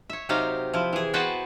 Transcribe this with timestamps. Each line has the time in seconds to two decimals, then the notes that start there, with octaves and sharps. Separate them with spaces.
0.10 C#5 E5
0.29 C3 F#3 D#4 G4 D#5 F5
0.74 F3 E4
0.93 E3 G#4
1.14 B3 F#4 B4 C5 G5 A5